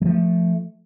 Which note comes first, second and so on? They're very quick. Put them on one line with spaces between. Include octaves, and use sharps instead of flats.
F#3 F3 A3